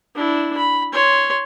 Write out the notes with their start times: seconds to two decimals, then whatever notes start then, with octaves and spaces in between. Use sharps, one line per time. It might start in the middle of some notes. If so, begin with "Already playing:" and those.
0.15 D4 E4
0.58 B5
0.93 C#5 C6